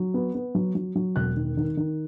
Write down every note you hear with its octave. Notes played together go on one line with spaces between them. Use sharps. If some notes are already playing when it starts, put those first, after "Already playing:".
Already playing: F#3
B3
B3
F#3
F#3
F#3
E1 F#6
D#3
D#3
D#3